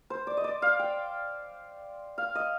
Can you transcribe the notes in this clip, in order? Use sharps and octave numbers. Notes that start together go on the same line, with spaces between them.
C5
D5
D#5
D5
F5
G5
F5
D#5